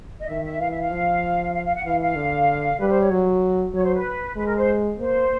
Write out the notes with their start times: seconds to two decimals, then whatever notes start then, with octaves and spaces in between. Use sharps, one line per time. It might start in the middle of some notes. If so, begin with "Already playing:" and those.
0.20 D#5
0.28 D#3 E5
0.43 E5
0.60 E3 F5
0.70 E5
0.80 F5
0.91 F3
1.54 F5
1.64 F5
1.75 F#5
1.84 E3 F5
2.00 F5
2.16 D3
2.79 G3 B4
2.89 C5
3.00 C#5
3.10 F#3
3.73 F#3 C#5
3.84 C5
3.94 B4
4.36 G#3 B4
4.46 A#4
4.57 C5
4.99 A#3 C5